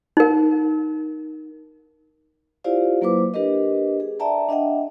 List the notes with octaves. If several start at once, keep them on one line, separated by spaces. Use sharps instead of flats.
D#4 A#4
E4 F4 G4 C5 D5 F5
F#3 A#3 E4 B4 C5 D6
D4 G4 A#4 B4 D#5
G#4
D5 E5 G5 A5 A#5
D4 D#5 E5 F#5 G5